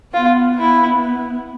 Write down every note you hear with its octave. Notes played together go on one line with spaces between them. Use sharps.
B3 F4
B3 E4